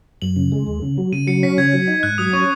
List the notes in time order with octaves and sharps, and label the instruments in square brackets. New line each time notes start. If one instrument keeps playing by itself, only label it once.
[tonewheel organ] F#2 [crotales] F#7
[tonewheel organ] C#3
G#3
D#2
C#3
F#3
[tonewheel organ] C#3 [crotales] D#7
[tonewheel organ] F#3 [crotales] C#7
[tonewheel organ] C#4 [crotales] B6
[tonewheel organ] C#3 [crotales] G#6
[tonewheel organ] F#3
D#4
[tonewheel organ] G#2 [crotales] F#6
[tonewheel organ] F#3 [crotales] D#6
[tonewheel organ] C#4 [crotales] C#6